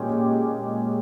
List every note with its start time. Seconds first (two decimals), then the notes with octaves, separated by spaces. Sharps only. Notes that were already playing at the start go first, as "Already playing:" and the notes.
Already playing: A#2 G#3 C#4 G4